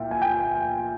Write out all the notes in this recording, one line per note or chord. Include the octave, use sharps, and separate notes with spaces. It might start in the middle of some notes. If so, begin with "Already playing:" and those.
Already playing: A#2 E4 E5 G5
G#5
G5